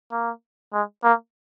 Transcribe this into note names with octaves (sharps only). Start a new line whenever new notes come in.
A#3
G#3
A#3